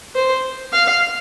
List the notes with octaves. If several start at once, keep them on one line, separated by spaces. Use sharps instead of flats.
C5
F5